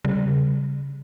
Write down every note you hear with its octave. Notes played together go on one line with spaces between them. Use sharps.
C#3 G3